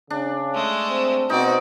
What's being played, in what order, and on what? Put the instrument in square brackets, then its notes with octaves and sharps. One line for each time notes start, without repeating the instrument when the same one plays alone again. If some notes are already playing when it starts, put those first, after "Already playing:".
[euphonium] C#3 [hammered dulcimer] D4
[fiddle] G#3 A3
[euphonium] C4
[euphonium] B2 [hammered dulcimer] C4 D#4 [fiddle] F#4 D5